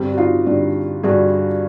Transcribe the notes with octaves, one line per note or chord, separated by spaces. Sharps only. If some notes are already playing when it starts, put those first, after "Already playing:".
Already playing: G2 D3 G3 C4
F#4
D#4 F4
G2 D3 G3
G2 D3 G3 F#4 G#4